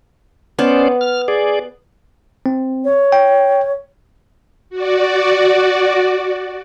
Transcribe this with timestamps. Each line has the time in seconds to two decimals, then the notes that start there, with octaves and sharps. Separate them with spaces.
0.59 B3 C#4 C5 D5
1.01 F6
1.28 G#4 D5
2.46 C4
2.85 C#5
3.12 G5
4.70 F#4 D5